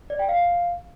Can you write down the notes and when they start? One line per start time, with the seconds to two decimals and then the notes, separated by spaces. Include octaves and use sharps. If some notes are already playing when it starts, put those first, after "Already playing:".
0.10 D5
0.19 G5
0.29 F5